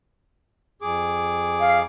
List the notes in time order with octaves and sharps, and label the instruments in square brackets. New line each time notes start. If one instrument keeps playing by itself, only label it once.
[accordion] F2 G#4 D6
[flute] F5